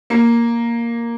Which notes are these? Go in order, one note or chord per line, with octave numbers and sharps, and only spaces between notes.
A#3